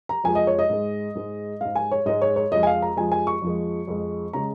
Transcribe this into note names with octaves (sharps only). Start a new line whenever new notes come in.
A#5
F2 F3 G#3 G#5
D#5
C#5
D#5
G#2 G#3
G#2 G#3
G#2 G#3 F5
G#5
C#5
G#2 G#3 D#5
C#5
C#5
F2 F3 G#3 D#5
G#5
F5
A#5
F2 F3 G#3 G#5
G#5
C#6
F2 F3 G#3
F2 F3 G#3
C#3 G#3 A#5